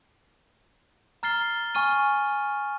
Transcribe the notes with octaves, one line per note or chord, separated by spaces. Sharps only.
A#5 F6 A6 C7 G7
G#5 C#6 F6 D#7